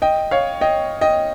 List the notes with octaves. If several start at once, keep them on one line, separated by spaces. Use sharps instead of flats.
D#5 G5
C#5 F5
D#5 G5
D#5 G5